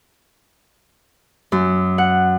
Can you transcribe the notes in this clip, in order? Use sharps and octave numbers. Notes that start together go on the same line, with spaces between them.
F#2
F#5